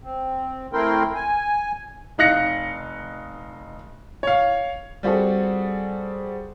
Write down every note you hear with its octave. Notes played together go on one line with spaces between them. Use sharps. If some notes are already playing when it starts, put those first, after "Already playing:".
C4
A3 C4 E4 A#4 G5 C6
G#5
F1 D#4 F5 F#6 A#6 C#7
C#5 F5
G3 C4 F#4 G#4 A4